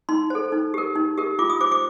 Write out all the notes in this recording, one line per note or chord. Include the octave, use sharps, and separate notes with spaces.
D#4 C6
A4 C5
D#4
G4 A#4
D#4
G4 A#4
F4 D6
D#6
C5 D6
D6